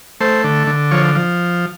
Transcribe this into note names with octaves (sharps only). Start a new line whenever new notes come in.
A3 C5
D3
D3
F3 C#5
F3